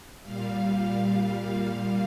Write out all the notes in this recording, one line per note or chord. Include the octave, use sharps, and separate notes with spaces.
A#2 G3 F5